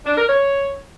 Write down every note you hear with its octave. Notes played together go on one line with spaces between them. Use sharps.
D4
A#4
C#5